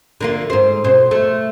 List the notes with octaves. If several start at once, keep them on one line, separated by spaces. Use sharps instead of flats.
D3 A#3 F4
G#2 C5
B2 C5
A3